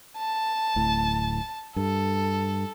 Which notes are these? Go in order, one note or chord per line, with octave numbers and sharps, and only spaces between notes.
A5
D1 A2
G2 A4